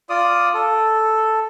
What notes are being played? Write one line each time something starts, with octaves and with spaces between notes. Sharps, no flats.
F4 D5 D#6
A4